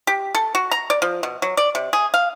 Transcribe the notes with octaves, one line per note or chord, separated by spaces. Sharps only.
G4
A4
F#4
A#5
D5
F3
B2
F#3
D5
C3
G#4
F5